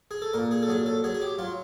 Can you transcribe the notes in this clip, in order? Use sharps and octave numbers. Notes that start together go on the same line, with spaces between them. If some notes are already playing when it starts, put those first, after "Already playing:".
G#4
A4
A#2 A#4
G#4
A4
F#3 G#4
A4
F#3 G#4
G#4
G4
F#3 F4